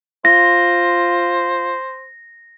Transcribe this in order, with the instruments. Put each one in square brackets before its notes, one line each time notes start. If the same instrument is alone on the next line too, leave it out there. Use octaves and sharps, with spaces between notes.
[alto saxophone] F4 [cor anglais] C5 [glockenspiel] A#6